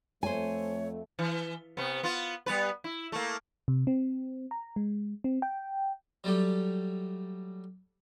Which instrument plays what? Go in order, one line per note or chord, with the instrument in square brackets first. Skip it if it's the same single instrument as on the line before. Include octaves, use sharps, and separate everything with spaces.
[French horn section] F2 A3 [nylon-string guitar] C5 G#5 [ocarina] C#5
[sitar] E3
C3 B3
B3 F4
G3 B3 B4
E4
A3 A#3
[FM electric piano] C3
C4
A#5
G#3
C4
G5
[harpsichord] F#3 G3 A3 G4